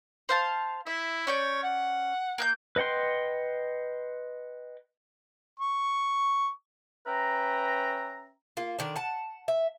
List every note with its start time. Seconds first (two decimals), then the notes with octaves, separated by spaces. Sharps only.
0.29 C5 F5 A5
0.86 E4 E5
1.27 C#4 C#5 D5 G6
1.63 F#5
2.38 A#3 F#6 G6
2.76 B4 D#5 F#5 G5 C6
5.60 C#6
7.07 C#4 B4 E5 G5 A#5
8.57 A#3 F4
8.79 D3 D#3 D4
8.96 F#5 A5
9.48 E5